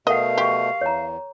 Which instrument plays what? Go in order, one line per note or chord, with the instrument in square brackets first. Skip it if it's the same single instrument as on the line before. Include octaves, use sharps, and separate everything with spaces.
[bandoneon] B2 A3 [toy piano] A#4 F#5 [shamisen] D#5 [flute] F5
[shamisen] G4 [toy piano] C6 C#6
[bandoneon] E2 [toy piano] C#5 A#5